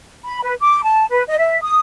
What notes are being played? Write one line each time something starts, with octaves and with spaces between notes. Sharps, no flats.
B5
B4
D6
A5
B4
D#5
E5
D#6